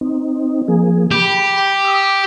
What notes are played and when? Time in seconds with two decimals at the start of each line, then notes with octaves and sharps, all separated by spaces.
0.01 C4 D#4
0.68 F3 A#3 G#4
1.11 G4 B5
1.85 D#6 E6